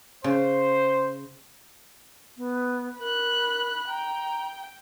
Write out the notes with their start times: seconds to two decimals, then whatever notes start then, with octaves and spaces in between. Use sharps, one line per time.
0.24 C#3 C5
2.37 B3
3.00 A#4 B5 F#6
3.89 G5 A#5